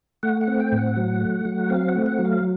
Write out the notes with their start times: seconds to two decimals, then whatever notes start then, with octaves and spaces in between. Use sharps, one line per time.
0.23 A3 F#5
0.41 F#5
0.48 C4
0.60 G5
0.72 A2
0.78 F#5
0.96 F#3
1.21 A3
1.45 F#3
1.70 C4 F5
1.88 F#5
1.95 A3
2.06 F#5
2.19 F#3
2.25 F5